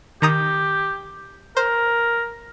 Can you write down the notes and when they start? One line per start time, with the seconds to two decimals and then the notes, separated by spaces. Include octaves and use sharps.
0.22 D#3 G4 A#5 D#6
1.57 A#4 C5